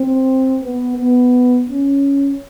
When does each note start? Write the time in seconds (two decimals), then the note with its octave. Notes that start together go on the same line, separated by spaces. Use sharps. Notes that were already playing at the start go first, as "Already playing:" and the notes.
Already playing: C4
0.62 B3
0.97 B3
1.68 C#4